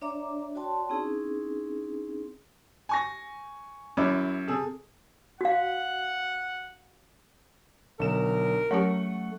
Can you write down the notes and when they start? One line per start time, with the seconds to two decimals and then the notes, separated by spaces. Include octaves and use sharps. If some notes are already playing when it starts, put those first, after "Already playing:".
0.02 D4 C#5 D5 E5 A#5 D6
0.55 F#4 C#5 D5 G5 A5 C6
0.90 C4 C#4 D#4 E4 G#4
2.89 G#5 C#6 A#6
3.97 F#2 E4 D6
4.48 C3 G#4 A4
5.41 F#4 F5 F#5
8.00 B1 D3 A#4 E7
8.71 F#3 A3 C#4 G4 F#5 C#6